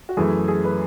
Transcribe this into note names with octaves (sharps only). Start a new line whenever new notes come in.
F#4
F#2 E3 A3 G#4
G#4
B4